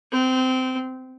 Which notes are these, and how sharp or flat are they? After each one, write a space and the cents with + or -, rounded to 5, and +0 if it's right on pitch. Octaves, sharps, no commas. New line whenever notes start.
C4 -20